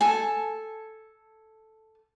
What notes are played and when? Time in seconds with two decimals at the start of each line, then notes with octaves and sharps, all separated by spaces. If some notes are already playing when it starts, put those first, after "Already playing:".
0.01 A4 G#5